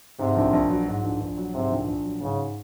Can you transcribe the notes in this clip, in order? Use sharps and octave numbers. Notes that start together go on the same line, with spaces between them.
G#2 C3
A#1
A#1
F#3
G#2
A#1
A#1
F#3
G#2 C3
A#1
A#1
F#3
G#2 C#3